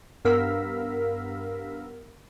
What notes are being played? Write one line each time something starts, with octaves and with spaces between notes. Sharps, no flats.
G2 B3 A#4 F5 E6 B6